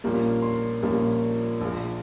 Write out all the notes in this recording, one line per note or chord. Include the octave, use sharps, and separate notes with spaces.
A#1 A#2 G3 A#3 C#4
C6
A#1 A#2 G3 A#3 C#4
A#1 A#2 G#3